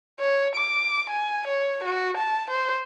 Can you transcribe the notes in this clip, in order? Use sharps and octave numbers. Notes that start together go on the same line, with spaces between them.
C#5
D6
G#5
C#5
F#4
A5
C5